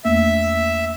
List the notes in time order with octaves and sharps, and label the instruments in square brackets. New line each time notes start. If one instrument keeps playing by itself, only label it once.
[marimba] E2 A3 A#3 [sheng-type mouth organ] E5